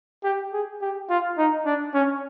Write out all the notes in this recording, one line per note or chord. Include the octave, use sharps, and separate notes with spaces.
G4
G#4
G4
F4
D#4
D4
C#4